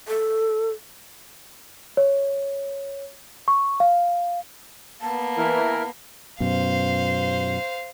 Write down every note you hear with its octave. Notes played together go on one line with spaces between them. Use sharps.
A4
C#5
C#6
F5
A#3 B3 A5
E3 E4 A#4
F#2 B2 C5 F5